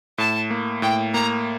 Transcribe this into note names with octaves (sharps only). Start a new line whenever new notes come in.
A2 A5
A#3
A2 G5
A#3 A#5